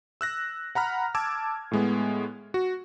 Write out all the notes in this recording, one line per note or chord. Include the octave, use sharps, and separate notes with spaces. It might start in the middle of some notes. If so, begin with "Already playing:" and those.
E6 F#6 A#6
F#5 A#5 B5 F6
A5 D6 E6 G#6
A2 G#3 B3
F#4